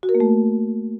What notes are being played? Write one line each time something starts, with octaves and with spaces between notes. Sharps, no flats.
F#4
A#4
A#3
A3